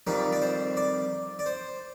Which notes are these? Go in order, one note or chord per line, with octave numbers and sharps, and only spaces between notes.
F2 D#3 G3 D5
D5
C5
D5
D5
C5